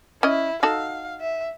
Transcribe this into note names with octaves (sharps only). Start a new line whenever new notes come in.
C#4 E4 D#5
D#4 F#4 A4 F5
E5